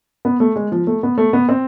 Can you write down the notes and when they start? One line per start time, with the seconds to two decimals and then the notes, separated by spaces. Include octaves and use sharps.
0.25 B3
0.40 A3
0.56 G#3
0.72 F3
0.87 A3
1.03 B3
1.18 A3
1.33 B3
1.49 C4